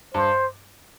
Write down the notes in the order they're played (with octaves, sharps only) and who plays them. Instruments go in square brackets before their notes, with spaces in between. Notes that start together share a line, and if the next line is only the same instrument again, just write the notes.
[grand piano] G2 [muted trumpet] C5